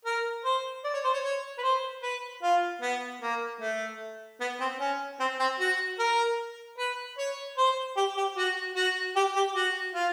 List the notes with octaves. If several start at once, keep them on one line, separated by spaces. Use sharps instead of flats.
A#4
C5
D5
C#5
C5
C#5
C#5
B4
C5
B4
F4
B3
A#3
A3
B3
C4
C#4
C4
C4
F#4
A#4
B4
C#5
C5
G4
G4
F#4
F#4
G4
G4
F#4
F4